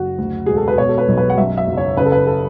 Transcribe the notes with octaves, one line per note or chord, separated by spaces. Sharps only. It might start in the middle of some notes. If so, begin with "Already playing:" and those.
Already playing: F#1 F#4
D2
E1 G#4
A4
B4
B2 C#5
A4
B4
B1
B4
F#5
F#2 E5
E5
F#1
C#5
C#3 B4
A4
B4
A4